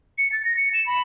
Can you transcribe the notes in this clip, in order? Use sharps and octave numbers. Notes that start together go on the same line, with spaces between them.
C#7
A6
A#6
C#7
E7
B5